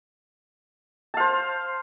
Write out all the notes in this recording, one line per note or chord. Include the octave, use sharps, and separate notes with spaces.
C5 F5 A5